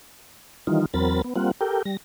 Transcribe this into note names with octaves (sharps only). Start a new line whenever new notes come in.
D#3 E3 G3 D#4 F4
E2 F#3 C4 A#4 B5 A6
B3
G3 A#3 C4 F4 F#5
G4 A4 A#4 G5
G3 A#6